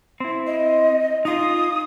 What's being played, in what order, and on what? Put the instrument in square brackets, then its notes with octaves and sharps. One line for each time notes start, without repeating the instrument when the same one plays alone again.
[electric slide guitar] C4 E4
[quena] D#5
[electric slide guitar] D#4 F4 [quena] D#6